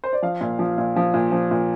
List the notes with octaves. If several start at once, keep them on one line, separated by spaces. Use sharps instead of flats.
C5
D5
F3 F5
A#2
F3
A#2
F3
A#2
F3
A#2